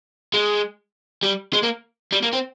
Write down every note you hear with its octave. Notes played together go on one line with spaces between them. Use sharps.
G#3
G3
G#3
A#3
G3
A#3
C4